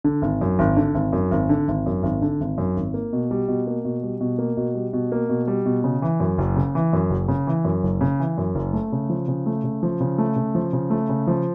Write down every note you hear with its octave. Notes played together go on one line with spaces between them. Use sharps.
D3
G#1
F#2
G#1
D3
G#1
F#2
G#1
D3
G#1
F#2
G#1
D3
G#1
F#2
G#1
A#3
B2
G3
B2
A#3
B2
G3
B2
A#3
B2
G3
B2
A#3
B2
G3
B2
C#3
E3
F#2
F#1
C#3
E3
F#2
F#1
C#3
E3
F#2
F#1
C#3
E3
F#2
F#1
A3
C#3
F3
C#3
A3
C#3
F3
C#3
A3
C#3
F3
C#3
A3
C#3
F3